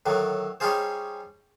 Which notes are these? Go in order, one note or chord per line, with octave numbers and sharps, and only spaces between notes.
A2 D3 D#3 F#3
G3 C#4 D#4 F4 G#4 C5